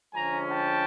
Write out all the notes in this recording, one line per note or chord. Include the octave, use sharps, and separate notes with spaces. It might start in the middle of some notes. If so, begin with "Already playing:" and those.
D3 F3 G#3 C#4 G#5 A#5
G5 A5